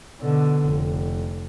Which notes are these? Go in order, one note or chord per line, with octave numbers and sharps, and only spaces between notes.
B2 D3
F1